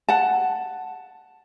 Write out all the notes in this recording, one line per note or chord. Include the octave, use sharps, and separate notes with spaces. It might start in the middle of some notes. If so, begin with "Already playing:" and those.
F#5 A5